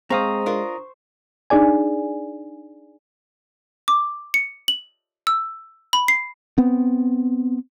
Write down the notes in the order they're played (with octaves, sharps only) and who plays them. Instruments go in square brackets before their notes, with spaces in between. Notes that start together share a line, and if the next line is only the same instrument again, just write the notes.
[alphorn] G#3 [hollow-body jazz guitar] C4 F5 [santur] C5 C#6 [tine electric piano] A#5 D#6
[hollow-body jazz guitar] D4 F4 A#4
[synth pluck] D4 D#4 G#4 D5 G#5
[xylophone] D6
C#7
F#7
E6
B5
C7
[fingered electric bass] B3 C4